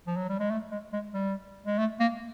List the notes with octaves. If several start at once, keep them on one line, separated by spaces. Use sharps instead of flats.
F3
F#3
G3
G#3
A3
G#3
G#3
G3
G#3
A3
A#3